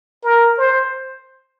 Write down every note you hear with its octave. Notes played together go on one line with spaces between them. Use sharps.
A#4
C5